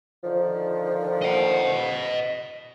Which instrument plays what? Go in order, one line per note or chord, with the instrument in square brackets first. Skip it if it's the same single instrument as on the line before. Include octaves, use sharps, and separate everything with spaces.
[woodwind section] D3 D#3 F3
[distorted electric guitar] D#5 F#5